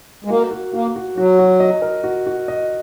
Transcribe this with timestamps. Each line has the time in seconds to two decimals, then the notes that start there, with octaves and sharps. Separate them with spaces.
0.25 G#3
0.29 A#3 F#4
0.51 F#4
0.73 A#3 F#4
0.96 F#4
1.17 F#3 F#4
1.39 F#4
1.60 D#5
1.82 A#4
2.04 F#4
2.27 F#4
2.48 D#5